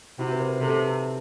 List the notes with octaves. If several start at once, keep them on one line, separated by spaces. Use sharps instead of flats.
C3 E4 F#4
B4
A#4 C5
C3 A4 B4